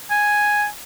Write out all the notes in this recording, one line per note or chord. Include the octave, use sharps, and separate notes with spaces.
G#5